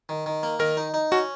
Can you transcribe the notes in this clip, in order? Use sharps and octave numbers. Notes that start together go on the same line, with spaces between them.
D#3
D#3
A#3
D#3 A#4
D#4
D#4
C#4 F#4